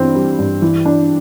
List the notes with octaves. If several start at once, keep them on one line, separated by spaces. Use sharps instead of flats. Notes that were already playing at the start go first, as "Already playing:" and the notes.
Already playing: G2 E3 C4
G3
G2
E3
D4